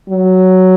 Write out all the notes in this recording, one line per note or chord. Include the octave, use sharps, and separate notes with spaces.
F#3